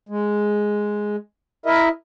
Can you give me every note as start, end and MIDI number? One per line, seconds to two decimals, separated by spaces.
0.09 1.16 56
1.66 1.89 64
1.66 1.89 70
1.66 1.89 75
1.66 1.89 76